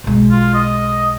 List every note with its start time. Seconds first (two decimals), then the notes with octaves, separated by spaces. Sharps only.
0.04 B1 G#3
0.31 F4
0.54 D#5